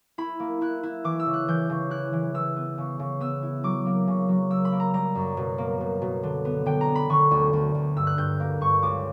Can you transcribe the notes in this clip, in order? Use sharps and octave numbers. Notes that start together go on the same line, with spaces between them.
E4 B5
A#3
E4 F#6
E4
E3 D6
E6
C#3
F#6
E3 G6
C#3
E4 F#6
E3
E3 E6
B3
C#3
C#3
B3 E6
E4
F#3 D6
A#3
C#3
F#3
A#3 E6
B5
A#3
A#5
G3 A#5
F#2
B2
A#3
B2
B2
D3
B3
D3 G5
A#5
B3
B5
D3 C#6
D2
D2
D2
G2 E6
F#6
G2 G6
A#3
G2 C#6
C#2 D6